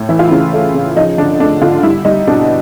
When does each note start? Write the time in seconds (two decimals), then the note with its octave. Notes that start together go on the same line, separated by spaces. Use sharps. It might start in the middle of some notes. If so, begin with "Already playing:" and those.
Already playing: A2
0.09 E3 E4
0.19 F4
0.28 E4
0.31 C#3
0.53 A3
0.74 C#3
0.96 F3 D#4
1.18 D3 D4
1.40 A3 D4
1.62 D3 F4
1.83 G3 E4
2.05 G3 D#4
2.27 B2 D4